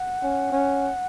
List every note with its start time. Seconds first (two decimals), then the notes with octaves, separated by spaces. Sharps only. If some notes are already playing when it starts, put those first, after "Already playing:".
Already playing: F#5
0.22 C#4
0.52 C#4